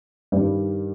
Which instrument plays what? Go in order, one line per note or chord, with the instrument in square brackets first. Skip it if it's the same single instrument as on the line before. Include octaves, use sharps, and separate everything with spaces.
[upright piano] G2 D#3 G3